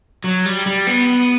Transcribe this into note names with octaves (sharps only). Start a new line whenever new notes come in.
F#3
G3
G3
B3